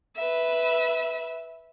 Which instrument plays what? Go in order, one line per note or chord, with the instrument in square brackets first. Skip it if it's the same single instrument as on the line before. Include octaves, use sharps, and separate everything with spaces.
[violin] B4 E5